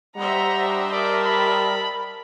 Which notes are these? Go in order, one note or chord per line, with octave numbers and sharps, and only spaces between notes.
G3 C5 D#5 E5 F#5 A#5
D4
A#4 D5 A5
B5